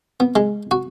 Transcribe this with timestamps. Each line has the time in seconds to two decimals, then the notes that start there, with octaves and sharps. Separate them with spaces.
0.20 B3
0.36 G#3
0.71 F#4